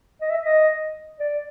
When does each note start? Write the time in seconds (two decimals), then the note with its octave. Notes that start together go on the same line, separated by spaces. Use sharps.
0.21 D#5
0.30 E5
0.45 D#5
1.20 D5